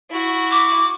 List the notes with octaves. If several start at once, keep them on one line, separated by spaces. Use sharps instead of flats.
E4 F#4
D6